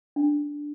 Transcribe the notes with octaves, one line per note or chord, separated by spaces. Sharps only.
D4